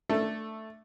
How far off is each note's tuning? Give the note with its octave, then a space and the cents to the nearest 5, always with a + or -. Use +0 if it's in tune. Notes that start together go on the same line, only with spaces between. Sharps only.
A3 +0 D4 +0 A4 +10